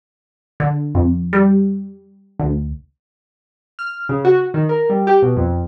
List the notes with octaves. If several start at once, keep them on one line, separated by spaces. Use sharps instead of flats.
D3
F2
G3
D2
F6
C#3
F#4
D#3
A#4
G3
G4
B2
F2